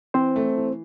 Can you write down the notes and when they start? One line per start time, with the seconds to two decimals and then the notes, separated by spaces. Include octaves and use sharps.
0.14 E3 C4 C5
0.36 A3
0.57 E3